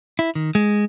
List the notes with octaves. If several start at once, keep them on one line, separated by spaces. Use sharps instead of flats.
E4
D#3
G#3